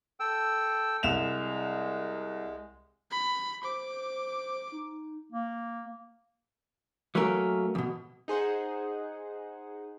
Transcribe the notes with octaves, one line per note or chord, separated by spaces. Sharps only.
A4 G5 E6
C2 G#3 E7 F7
B5
C5 D6
D#4
A#3
F#3 A3 A#3 C#4 A#4
E2 B2
D#4 G#4 C5 F#5